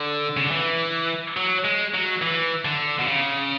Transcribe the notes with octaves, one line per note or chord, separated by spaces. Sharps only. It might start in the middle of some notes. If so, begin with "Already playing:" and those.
Already playing: D3
C#3
D3
E3
F#3
G#3
F#3
E3
D3
B2
C#3